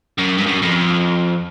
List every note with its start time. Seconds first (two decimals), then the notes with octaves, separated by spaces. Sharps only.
0.18 F#2
0.38 G2
0.46 F#2
0.62 F2